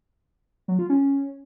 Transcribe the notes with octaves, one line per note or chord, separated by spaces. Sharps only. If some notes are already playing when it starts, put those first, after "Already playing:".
F#3
F4
C#4